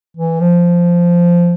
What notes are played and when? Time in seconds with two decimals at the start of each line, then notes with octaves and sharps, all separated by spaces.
0.16 E3
0.40 F3